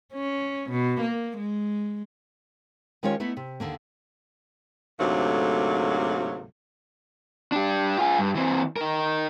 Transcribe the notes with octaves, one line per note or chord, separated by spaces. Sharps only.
C#4
B2
A#3
G#3
D#3 G#3 C#4 F4 G4 C#5
A3 B3 D#4 E4
C3
D#2 D3 A#3
D2 G#2 C3 F#3 A3 A#3
D4 G4
F4 G#4
G2
E3 C4
D#4 A#4